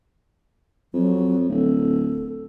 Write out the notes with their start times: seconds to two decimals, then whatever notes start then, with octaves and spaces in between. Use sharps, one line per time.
0.94 F2 F#3
1.49 D1 A4